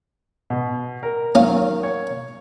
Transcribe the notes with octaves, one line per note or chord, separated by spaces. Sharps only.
B2
A#4
D#3 F#3 C#4 F5
C#5